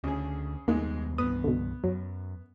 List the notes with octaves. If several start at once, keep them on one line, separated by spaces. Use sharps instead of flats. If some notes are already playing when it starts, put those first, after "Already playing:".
D2 C#3 G#4
D#2 G#2 G3 G#3 A#3 B3
C2 G2 B3 D#6
B2 D3
F#2 F#3